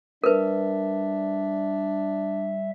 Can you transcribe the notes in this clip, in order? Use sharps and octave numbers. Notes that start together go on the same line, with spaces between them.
G3 D4 A#4 B4 E5